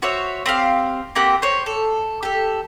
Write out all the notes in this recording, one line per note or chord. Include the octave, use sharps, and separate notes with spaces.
F#4 C5 C#5 E5
C4 G4 F5
A#3 C4 G4 F#5
C5 C#5
A4
G4 A4